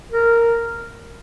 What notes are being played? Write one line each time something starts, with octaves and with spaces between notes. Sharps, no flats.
A#4